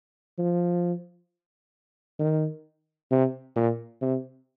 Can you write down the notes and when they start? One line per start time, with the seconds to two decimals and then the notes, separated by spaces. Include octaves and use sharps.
0.38 F3
2.19 D#3
3.11 C3
3.56 A#2
4.01 C3